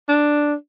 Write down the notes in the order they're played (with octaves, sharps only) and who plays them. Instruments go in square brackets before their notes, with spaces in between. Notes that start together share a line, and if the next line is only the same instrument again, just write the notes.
[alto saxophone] D4